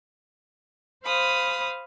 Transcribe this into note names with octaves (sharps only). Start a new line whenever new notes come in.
C5 F5 B5 D#6